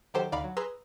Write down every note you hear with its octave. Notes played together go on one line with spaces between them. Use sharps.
D#3 F#3 G4 A4 C5
D2 D3 D#4 D5 F5 B5
F#3
G#4 B4 A#5 C6 E6